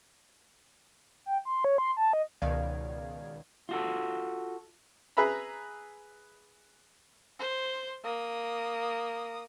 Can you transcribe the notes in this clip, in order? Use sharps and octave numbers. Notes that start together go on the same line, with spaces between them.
G5
C6
C#5
C6
A5
D#5
C#2 B2 D#3 D5 F5 G#6
F4 F#4 A4
G#4 B4 E5 A#5 B5
C5
A#3 D#6